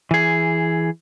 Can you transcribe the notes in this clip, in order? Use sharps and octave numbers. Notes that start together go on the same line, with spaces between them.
E3 G#4